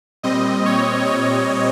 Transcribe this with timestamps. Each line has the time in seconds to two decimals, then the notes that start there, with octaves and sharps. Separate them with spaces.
0.23 A#2 G3 C4 D#5
0.66 C#5
1.07 C#5